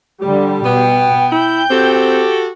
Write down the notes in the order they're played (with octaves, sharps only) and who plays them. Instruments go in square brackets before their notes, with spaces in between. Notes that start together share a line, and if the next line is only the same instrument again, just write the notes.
[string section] D3 G3 [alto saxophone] G4
[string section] B2 [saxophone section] B3 [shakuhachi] G5
[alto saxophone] E4 [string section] G6
[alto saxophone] C4 [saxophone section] F#4 G4 A4